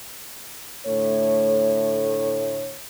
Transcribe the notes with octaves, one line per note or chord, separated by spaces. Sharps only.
A2 D3 A3 C#5